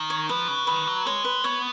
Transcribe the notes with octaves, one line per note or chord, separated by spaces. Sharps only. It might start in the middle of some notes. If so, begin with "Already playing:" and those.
Already playing: D#3
C#5
F3 B4
C#3
D#3 B4
F#3
G#3 C#5
B4
B3 C#5